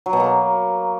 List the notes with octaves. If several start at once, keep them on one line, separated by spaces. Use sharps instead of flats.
F#3
B2
A#3